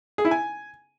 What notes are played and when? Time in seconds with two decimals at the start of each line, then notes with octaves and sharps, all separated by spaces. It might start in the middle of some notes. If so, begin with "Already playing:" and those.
0.18 G#4
0.25 E4
0.31 G#5